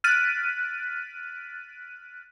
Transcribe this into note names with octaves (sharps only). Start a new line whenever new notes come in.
F6 F#6 A6 B6 D7 D#7